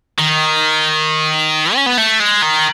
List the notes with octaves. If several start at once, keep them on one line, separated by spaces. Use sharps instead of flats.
D#3
C#4
B3
A3
G#3
D#3